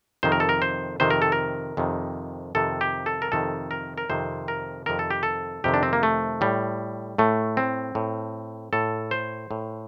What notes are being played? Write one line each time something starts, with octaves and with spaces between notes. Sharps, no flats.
F2 C3 D#3 C5
A#4
A4
A#4
C5
F2 C3 D#3 C5
A#4
A4
A#4
F2 C3 D#3
F2 C3 D#3 A4
G4
A4
A#4
F2 C3 D#3 A4
A#4
A#4
F2 C3 D#3 C5
A#4
F2 C3 D#3 A#4
A4
G4
A4
F2 C3 D#3 G4
D4
C4
A#3
A3
A2 G3
A2 A3
C4
A2
A2 A4
C5
A2